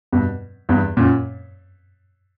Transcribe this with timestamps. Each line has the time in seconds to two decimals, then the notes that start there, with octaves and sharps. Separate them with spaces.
0.12 G2 B2
0.69 E2 G2
0.97 F#2 A#2